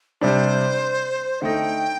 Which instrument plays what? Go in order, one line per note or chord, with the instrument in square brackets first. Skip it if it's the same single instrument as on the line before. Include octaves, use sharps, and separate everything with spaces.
[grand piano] C3 G3 D4 [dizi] C5
[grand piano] D3 A3 D#4 [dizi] G5